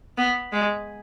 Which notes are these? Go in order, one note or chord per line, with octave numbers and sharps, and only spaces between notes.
B3
G#3